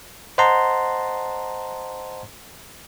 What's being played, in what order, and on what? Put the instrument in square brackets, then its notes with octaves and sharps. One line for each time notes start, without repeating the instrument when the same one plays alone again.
[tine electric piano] C5 D#5 F#5 A5 A#5 C6